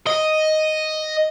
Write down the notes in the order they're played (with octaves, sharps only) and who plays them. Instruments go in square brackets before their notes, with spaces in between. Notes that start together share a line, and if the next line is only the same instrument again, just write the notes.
[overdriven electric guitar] D#5